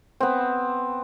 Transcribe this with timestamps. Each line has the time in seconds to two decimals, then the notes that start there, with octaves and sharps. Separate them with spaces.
0.20 B3 C4